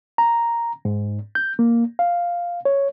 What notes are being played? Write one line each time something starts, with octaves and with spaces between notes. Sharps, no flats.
A#5
G#2
G6
A#3
F5
C#5